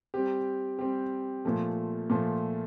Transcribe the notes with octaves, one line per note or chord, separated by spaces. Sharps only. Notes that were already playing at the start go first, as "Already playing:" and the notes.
G3 C4 G4
G3 C4 G4
A#2 F3 A3
A#2 F3 A3